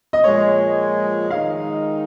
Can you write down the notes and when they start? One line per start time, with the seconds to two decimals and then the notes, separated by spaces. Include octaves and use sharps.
0.13 D#5
0.24 A#2 F3 G#3 C#5
1.30 D#3 G#3 D#4 F5